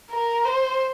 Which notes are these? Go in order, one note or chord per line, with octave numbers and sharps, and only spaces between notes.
A#4
C5